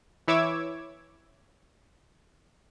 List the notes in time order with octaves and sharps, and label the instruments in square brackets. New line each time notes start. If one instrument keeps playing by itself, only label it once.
[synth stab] E3 E4 C#5 D6 E6 G#6